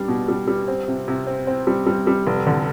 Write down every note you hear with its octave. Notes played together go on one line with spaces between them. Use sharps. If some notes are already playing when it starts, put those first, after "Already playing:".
Already playing: G3 D4
B2
G3
G3
C4
C3
C3
C4
C4
G3
G3
G3
F1
D3